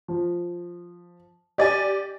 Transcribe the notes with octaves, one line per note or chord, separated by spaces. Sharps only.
F3
G4 D5 D#5 G#5 A6